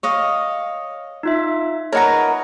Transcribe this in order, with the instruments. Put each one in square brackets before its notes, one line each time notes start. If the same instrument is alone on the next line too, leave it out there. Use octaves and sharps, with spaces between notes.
[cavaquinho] C#5 D#5 F5
[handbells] D#4 F4 E5
[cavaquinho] A#4 B4 A#5 [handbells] C#5 D#5 F#5